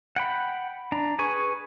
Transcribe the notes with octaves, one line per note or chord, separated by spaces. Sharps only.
F#5 G5 B5
D4 A#5
G#4 B4 G#5 C#6